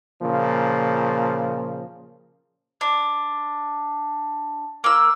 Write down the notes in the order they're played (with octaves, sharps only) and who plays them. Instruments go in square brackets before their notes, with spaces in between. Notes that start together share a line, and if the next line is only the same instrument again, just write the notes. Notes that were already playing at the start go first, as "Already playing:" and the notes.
[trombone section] A#2 C#3 F3
[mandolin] D4
A#3 E6